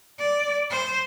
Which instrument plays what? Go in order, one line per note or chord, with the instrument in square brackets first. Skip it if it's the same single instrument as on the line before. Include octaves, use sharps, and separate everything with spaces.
[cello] D5
C5